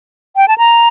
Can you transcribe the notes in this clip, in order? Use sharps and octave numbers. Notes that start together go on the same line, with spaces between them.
G5
A5
A#5